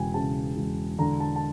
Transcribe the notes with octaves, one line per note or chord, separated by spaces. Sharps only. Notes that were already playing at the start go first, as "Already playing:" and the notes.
Already playing: E1 C#3 G5 G#5
C#3 A5
E1
D3 A#5
A5
A5